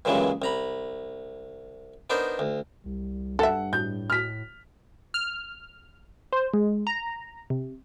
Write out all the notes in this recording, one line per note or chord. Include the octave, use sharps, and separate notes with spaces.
G2 A#2 C#3 E3 F#3 G#3
C2 A#5 B5
B3 D4 D#4 A#4 C5
D2
C2 G3
G2 A4 E5 F#5
A2 G6
F6 B6
F6
C5
G#3
A#5
C3